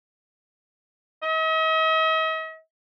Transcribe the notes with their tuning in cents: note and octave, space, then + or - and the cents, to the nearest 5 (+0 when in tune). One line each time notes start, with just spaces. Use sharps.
D#5 +45